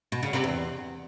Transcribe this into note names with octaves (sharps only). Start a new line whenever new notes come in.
B2
C#3
C3
E2